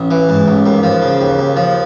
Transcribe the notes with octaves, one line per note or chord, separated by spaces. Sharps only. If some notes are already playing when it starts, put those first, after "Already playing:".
Already playing: A1
E3
G#2
A1
D#2
F3
C#3
D#2
D#2
F3